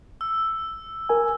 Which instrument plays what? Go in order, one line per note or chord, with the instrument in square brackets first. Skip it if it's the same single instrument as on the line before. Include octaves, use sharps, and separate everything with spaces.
[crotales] E6
[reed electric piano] A#4 G#5